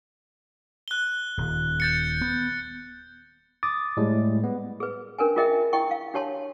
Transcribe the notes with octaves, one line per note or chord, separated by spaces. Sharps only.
F#6 G7
D#1
G6 A6 C#7
B3
D6 D#6 A6
A2 G3 G#3
B3
G#4 B4
C#4 D4 A#4 B4 G#5
F4 G#4 A#4 D#5 E5 G5
E4 D#5 G5 C#6
F5
D4 G4 C#5 A5 C6